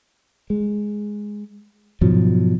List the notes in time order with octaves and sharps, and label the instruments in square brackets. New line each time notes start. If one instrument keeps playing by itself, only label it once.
[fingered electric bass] G#3
G#2 B2 F3 F#3